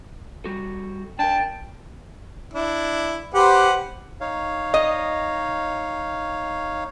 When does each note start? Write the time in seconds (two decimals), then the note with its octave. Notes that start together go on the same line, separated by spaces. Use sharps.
0.44 G3 F#4 A4
1.19 D4 A#4 G5 A5
2.53 D4 E4
3.34 G4 B4 C5 F#5
4.21 D#4 C#5 F5
4.74 D#5